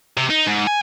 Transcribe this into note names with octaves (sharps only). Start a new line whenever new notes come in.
C3
D#4
G#2
G#5